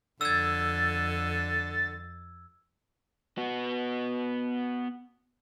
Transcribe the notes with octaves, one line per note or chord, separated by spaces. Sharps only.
F2 D3 E6 G#6 A6
B3 F#4